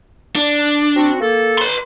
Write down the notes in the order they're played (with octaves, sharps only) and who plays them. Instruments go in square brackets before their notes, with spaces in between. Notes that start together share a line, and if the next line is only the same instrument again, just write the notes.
[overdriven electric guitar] D4
[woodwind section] C4 F#4
A#3 A4
[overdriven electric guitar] B4 C6